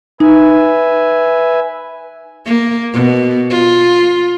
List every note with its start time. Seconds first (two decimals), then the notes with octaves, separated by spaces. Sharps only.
0.20 D#4 B4 E5 G#5
2.46 A#3
2.93 B2
3.50 F4